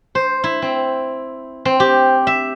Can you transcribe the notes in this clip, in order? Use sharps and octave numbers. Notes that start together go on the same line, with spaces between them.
C5
E4
C4
C4
G4
E5